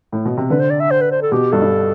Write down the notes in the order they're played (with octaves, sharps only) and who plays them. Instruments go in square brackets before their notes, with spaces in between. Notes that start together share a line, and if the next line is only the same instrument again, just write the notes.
[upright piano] A2
B2
C3
[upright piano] D3 [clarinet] B4
[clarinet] C5
D5
E5
C5
B4
C5
A4
[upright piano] B2 [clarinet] G4
[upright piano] G2 [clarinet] A4
[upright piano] G2